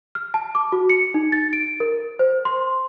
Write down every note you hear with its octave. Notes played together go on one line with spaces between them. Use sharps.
F6
A5
D6
F#4
C#7
D#4
A6
D7
A#4
C5
C6